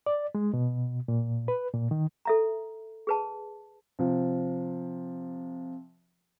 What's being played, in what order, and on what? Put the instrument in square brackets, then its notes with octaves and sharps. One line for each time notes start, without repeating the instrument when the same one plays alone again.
[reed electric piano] D5
G#3
B2
A#2
B4
A#2
D#3
[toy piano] A4 E5 A#5
G#4 B4 A5
[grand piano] C3 F3